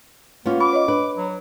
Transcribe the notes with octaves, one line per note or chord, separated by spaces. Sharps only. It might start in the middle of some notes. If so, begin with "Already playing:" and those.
A#3 B3 C#4 F4
B5 D6
C#5 D#5
D4 B4
F#3